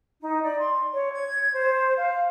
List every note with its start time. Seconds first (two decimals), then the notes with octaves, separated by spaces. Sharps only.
0.21 D#4
0.42 D5
0.58 C6
0.93 C#5
1.12 G#6
1.54 C5
1.97 F5